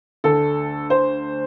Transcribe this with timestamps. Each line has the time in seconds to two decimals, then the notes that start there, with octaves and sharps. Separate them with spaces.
0.24 D2 D3 A3 A4
0.90 C5